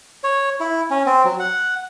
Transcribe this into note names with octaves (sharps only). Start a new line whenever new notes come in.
C#5
E4
C#4
C4
F#3
F#5